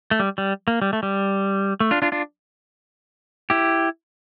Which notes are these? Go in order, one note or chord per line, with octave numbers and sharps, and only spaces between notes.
A3
G3
G3
A#3
G3
A3
G3
A3
D4 F4
D4 F4
D4 F4
E4 G4